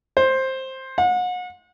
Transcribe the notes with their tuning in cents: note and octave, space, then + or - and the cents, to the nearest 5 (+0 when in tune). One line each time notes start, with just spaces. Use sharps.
C5 +10
F#5 -35